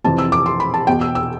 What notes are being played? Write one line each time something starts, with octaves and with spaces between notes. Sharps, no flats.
F2 C3 E3 A5
E6
D6
C6
B5
A5
E2 B2 G5
E6
E6